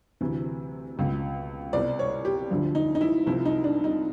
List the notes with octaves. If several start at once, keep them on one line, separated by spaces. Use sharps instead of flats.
D2 C3 E3
C#2 B2
C2 B2 D5
C#5
G4
D2 D3 F3
D#4
D#4
E4
C2 C3 F3 E4
D#4
D4
D#4